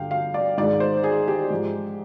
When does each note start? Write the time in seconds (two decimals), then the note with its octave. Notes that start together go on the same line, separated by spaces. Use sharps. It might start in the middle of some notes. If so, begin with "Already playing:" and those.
Already playing: G2 D3 G3 F5 G5
0.11 F5
0.34 D5
0.57 G#2 D#3 G#3 D5
0.80 C5
1.04 G#4
1.28 G4
1.50 G#2 F3 G#3